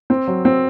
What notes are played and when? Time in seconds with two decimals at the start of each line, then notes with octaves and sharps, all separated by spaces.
0.10 C4
0.27 F#3
0.45 C4